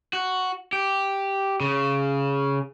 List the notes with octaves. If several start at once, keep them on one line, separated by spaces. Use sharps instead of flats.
F#4
G4
C#3